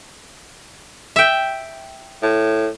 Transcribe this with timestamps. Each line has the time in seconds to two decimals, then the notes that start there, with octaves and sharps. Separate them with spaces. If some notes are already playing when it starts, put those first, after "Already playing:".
1.16 E5 G5
2.23 A2